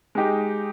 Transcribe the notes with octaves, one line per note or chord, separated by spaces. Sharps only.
G#3 D#4 G4